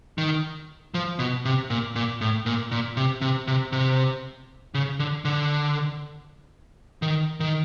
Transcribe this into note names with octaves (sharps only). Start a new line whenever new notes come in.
D#3
F3
B2
C3
A#2
A#2
A2
A#2
A#2
C3
C3
C3
C3
C#3
D3
D3
D#3
D#3